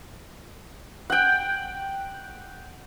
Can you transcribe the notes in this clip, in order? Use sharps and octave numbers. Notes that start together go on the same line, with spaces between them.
F#5 G5